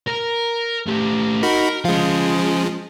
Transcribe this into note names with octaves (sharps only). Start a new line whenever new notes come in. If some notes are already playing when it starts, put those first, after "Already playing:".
A#4
A2 G4
D#4 F#4 A#4 B5
F3 G#3 C#4 F5